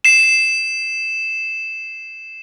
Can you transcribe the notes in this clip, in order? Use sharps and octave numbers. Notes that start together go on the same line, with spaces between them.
C7 E7